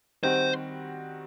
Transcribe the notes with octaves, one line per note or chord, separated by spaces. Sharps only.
D#3 G3 C4 F#4 C5